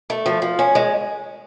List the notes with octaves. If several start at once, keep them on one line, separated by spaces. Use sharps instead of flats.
A3
F3
F3
C#4
G#3